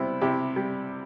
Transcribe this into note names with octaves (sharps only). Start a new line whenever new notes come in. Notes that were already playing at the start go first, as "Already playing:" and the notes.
Already playing: C3 G3 B3 C4 E4
C3 E4 G4
G3